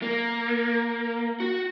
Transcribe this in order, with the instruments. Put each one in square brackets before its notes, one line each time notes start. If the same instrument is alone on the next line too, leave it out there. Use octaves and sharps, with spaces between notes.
[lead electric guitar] A#3
F#4